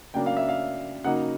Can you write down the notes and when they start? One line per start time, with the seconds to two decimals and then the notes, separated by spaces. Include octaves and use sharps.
0.14 C#3 F#3 A#3 D4 G5
0.26 F5
0.37 E5
0.49 F5
1.04 C#3 F#3 A#3 D#4 F#5